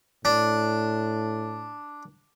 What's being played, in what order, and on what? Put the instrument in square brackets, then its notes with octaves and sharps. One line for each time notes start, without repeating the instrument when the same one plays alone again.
[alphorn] A2 [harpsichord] D4